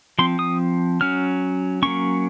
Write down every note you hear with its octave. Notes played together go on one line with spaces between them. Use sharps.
F3 C4 C6
D#6
F#3 C#4 F6
F#3 A#3 C#4 C#6